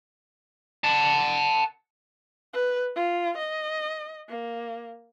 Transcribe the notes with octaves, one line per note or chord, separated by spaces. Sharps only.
F#5 A5
B4
F4
D#5
A#3